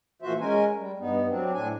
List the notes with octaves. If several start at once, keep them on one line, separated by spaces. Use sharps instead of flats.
A#2 E3 F3 F#4 C5 E5
G#3 C#4 A#4 G#5
G3
G2 B3 D#4
F#3 C4 D4
A2 D4 G#5